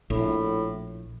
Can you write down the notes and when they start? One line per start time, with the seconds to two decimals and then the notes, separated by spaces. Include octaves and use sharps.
0.10 A#1 A2